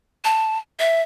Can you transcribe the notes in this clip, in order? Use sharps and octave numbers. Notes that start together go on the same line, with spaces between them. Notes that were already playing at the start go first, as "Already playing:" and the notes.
A5
E5